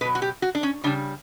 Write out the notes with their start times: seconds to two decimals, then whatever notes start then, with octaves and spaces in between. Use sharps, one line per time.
0.01 B2 B4
0.05 F#3
0.15 F#4
0.22 G4
0.42 F#4
0.55 D4
0.63 C#4
0.84 C#3 G3 D4